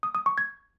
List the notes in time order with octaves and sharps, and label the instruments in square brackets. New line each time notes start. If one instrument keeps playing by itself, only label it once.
[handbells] D#6
D#6
C#6
G#6